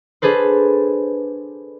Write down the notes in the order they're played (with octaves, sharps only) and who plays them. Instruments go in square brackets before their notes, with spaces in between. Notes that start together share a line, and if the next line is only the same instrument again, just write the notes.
[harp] D4 G#4 A4 B4 C5